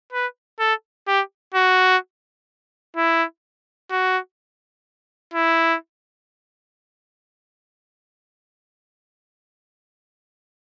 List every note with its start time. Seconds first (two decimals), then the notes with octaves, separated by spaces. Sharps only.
0.12 B4
0.60 A4
1.07 G4
1.54 F#4
2.96 E4
3.90 F#4
5.33 E4